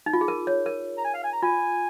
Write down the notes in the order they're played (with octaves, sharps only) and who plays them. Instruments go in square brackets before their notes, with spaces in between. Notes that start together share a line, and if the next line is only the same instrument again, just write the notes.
[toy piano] D#4
F4
G#4
A#4
C#5
A#4
[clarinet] A#5
G#5
F5
G#5
A#5
[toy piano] F4 [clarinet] G#5